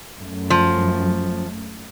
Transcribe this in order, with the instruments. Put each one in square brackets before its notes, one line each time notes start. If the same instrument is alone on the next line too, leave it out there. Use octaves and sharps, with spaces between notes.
[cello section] F#2 A3
[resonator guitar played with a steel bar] F3